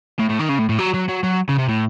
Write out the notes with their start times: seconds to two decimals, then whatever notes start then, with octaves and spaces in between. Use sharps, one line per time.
0.19 A2
0.29 A2
0.39 D#3
0.49 C#3
0.59 A2
0.69 A2
0.79 F#3
0.94 F#3
1.09 F#3
1.24 F#3
1.49 C#3
1.58 C3
1.69 A2